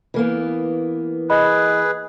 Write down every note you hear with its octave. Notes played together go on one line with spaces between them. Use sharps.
E3 A#3 B3
G#4 B4 D#5 B5